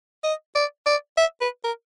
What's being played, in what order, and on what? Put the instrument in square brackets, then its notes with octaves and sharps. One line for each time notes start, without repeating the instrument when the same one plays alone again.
[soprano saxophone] D#5
D5
D5
E5
B4
A#4